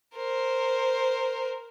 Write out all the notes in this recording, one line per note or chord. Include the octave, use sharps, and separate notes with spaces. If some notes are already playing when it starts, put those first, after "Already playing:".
A#4 C5